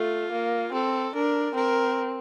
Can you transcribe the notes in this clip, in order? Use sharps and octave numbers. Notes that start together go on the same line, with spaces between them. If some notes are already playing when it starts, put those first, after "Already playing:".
Already playing: A3 F4
A#3
C4 A4
D4 A#4
C4 A#4